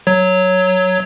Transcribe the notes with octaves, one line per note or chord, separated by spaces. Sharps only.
F#3 C#5